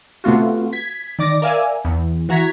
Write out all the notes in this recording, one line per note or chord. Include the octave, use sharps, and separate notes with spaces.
C3 A3 B3 F4 F#4
G#6 B6
D#3 D5 D6 A#6
A#4 D5 E5 F5 G#5
E2
E3 F#4 A#5 G#6 B6